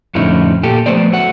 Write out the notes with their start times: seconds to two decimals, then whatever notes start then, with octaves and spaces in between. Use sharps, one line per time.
0.15 F2 A2 D3 C#4 D#4 E4
0.63 A#2 G4 A4
0.86 F3 A3 B3 C5 D5
1.12 F#3 A3 F#5